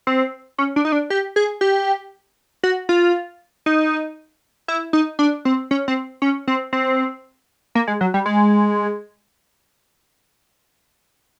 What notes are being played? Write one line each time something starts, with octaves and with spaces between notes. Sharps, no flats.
C4
C#4
D4
D#4
D4
G4
G#4
G4
F#4
F4
D#4
E4
D#4
D4
C4
C#4
C4
C#4
C4
C4
A#3
G#3
F#3
G3
G#3